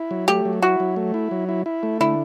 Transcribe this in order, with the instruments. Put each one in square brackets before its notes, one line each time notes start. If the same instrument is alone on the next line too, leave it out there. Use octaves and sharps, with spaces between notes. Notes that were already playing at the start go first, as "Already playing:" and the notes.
Already playing: [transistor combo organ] E4
F#3
[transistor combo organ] A3 [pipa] G4
[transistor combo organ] F#3
[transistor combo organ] E4 [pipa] F#4
[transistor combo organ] F#3
A3
E4
F#3
E4
E4
A3
[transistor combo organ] D3 [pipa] E4